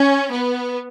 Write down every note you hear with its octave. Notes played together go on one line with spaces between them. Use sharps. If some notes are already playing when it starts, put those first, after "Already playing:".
Already playing: C#4
B3